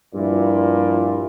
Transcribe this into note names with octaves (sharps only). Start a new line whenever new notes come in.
G2 A#2 F3 E4